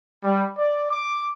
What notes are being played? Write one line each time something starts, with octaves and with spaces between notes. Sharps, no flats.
G3
D5
D6